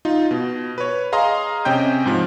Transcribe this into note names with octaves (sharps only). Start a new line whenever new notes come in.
D#4 F4
B2
B4 C#5
G#4 D#5 F5 A#5 C6 D#6
C3 C#4 D#5 G5 G6
G#2 F3